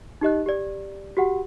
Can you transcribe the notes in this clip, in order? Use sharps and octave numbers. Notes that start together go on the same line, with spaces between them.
D#4 G4 D#5 F#6
G4 D5
F#4 G4 F#5